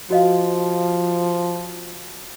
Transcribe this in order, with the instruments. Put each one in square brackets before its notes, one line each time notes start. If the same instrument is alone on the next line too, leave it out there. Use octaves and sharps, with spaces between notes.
[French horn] F3 [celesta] F#4 D#5 F5